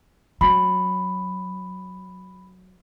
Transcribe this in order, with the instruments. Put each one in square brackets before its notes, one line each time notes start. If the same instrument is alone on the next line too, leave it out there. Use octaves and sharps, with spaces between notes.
[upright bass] F#3 [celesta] B5